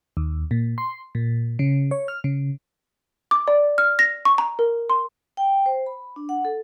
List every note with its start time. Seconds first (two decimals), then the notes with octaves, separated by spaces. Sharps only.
0.17 D#2
0.51 A#2
0.78 C6
1.15 A#2
1.59 C#3
1.91 C#5
2.08 F6
2.24 C#3
3.31 D6
3.48 D5
3.78 F6
3.99 A#6
4.25 C#6
4.38 A#5
4.59 A#4
4.90 C6
5.37 G5
5.66 C5
5.86 B5
6.16 D4
6.29 F#5
6.45 A4